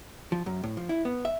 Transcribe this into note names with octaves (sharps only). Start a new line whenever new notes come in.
F3
F#2
A2
F3
E4
B3
E5